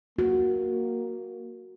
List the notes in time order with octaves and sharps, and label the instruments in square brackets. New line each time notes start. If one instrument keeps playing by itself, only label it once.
[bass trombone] A#3 [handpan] F#4